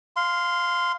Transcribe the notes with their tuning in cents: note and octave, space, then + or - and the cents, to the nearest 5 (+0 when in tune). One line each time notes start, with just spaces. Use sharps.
F5 +5 C6 -15